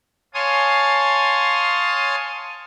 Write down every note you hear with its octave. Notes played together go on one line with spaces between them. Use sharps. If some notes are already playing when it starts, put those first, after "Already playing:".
C#5 F5 G#5 A5 C6 D#6